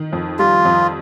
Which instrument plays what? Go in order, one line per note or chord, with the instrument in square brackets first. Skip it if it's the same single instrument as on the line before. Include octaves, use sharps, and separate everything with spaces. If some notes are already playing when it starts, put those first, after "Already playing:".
Already playing: [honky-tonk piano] D#3
F2
[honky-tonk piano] G3 [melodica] F4
[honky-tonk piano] F2